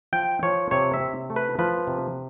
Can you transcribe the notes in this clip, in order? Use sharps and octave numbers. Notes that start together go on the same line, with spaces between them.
F3 G5
F3 C#5
C3 C#5
E5
C3
A3
B4
F3 B4
C3